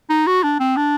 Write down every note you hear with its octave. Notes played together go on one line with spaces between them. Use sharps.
D#4
F#4
D4
C4
D4